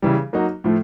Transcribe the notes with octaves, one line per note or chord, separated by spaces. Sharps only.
C#3 E3 G3
F#3 A#3 D#4 F#4
A2 F3 A3